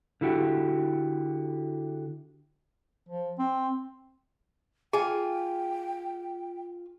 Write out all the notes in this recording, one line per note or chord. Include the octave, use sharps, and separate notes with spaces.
D3 E4 F#4 G4
F3
C4
F4 G#4 G5 G#5